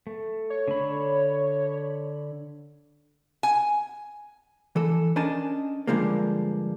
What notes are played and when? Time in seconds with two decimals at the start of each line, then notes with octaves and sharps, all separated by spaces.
0.07 A3
0.50 C#5
0.68 D3 B5
3.43 G#5
4.76 E3 A4
5.16 C#4 D4 A#4 D#5 G#5 A5
5.87 G2 D3 F3 G#3 A#3